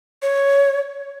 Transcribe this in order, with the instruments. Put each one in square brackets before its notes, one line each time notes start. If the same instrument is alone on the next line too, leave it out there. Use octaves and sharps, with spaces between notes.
[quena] C#5